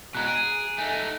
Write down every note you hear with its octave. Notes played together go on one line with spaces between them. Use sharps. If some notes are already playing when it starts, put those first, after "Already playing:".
B2 G#3 A#5 F#6
G#4 D7
A3 D#4 G#5